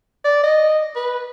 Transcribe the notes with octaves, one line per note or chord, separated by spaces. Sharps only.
D5
D#5
B4